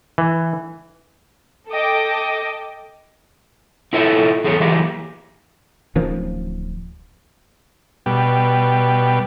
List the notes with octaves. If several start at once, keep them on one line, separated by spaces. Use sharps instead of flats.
E3
A4 D#5 G5 D6
E4 F4 A4 C#5 D#5 E5
E2 G#4 A4 C#5
E3 F#3 G#3 A#3 G4
D1 D#3 F3 C#4
B2 G3